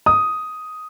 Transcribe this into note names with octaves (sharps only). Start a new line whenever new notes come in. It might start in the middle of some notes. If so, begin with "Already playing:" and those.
D#6